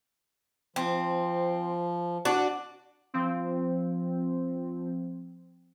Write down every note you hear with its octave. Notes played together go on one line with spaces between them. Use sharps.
F3 C4
D4 F#4
F3 C4